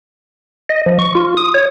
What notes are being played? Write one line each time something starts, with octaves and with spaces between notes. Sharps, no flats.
D#5
F3
C#6
F4
D#6
C#5